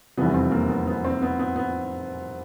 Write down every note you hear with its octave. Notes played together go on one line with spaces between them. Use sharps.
F1 E2 C3 E3 G3 B3
C4
A#3
B3
B3
C4
B3
B3
B3